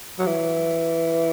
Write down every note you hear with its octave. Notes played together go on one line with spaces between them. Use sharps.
F#3
E3